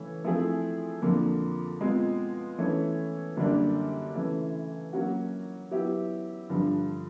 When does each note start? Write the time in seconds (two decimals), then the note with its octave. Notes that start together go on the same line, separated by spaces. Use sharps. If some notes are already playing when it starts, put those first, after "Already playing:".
Already playing: C#3 E3 A3 C#4
0.24 F3 A3 C4 E4 G#4
1.02 F2 D3 F3 A#3
1.81 B2 G#3 C4 F4
2.58 E3 A3 C#4
3.37 F#2 D3 G3 A#3 D4
4.15 C#3 E3 A3
4.93 F#3 A#3 C#4 F#4
5.71 F#3 B3 E4 G4
6.50 G2 D3 F3